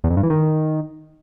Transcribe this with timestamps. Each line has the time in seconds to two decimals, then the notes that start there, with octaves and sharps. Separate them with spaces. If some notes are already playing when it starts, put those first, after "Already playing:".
0.04 E2
0.10 F2
0.17 G2
0.23 E3
0.30 D#3